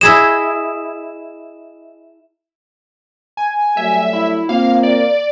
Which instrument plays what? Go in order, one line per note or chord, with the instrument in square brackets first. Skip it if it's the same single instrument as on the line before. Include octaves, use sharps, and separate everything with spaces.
[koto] E4 G#4 D#5 [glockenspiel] E7
[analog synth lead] G#5
[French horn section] F#3 G3 A3 [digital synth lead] E5
[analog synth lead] E4
[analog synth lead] A#3 [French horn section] C4 F4 C5 [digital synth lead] F5
[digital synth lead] D5